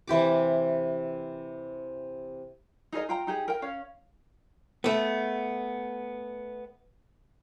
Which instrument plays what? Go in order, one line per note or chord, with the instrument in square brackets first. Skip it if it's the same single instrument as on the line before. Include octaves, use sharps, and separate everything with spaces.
[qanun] C3 E3 G4 D6
[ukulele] D#4 G#4 A#4 D#5
F4 G5 A#5
D#4 G4 G#4
A#4 G5
C#4 C#5 F5
[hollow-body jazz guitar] A3 B3